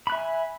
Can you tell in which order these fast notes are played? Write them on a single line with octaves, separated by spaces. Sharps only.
B5 F#6 E5 G#5